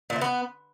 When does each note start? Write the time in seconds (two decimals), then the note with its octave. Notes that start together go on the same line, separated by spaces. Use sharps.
0.10 A#2
0.16 E3
0.21 B3